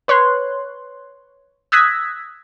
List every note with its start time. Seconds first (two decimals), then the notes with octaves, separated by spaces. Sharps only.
0.08 B4 C#5 C6 F#6
1.72 D#6 E6 F#6 G#6 A#6 B6